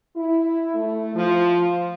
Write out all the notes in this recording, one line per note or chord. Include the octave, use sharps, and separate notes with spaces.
E4
A3
F3